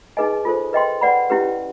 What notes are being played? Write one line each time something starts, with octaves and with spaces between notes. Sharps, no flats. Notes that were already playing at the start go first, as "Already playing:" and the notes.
D#4 G#4 B4 D#5 G#5
F4 A4 C5
B4 D#5 G5 C6
B4 D5 F#5 B5
C#4 E4 G4 B4